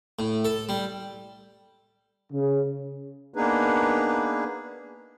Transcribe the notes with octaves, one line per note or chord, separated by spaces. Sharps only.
A2
A4
G3
C#3
A#3 B3 D4 D#4 G#4 B4